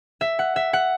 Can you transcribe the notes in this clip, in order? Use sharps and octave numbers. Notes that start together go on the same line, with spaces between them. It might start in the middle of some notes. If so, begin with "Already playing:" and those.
E5
F#5
E5
F#5